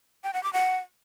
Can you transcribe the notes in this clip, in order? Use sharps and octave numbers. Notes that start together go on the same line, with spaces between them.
G5
F#5
D6
F#5